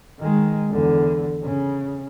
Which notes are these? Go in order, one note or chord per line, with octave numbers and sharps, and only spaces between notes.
D#3 G#3
E2 D3
C#3